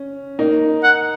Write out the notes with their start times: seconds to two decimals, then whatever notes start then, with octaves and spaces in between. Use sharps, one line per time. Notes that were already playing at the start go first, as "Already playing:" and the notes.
Already playing: C#4
0.39 A#3 D#4
0.83 F#5